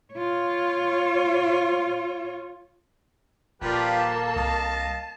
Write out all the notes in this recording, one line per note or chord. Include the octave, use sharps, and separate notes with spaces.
F4 C#5
D#1 F3 A#3 F4 G4 A4 B4 D5
A5
C2 D#5 F5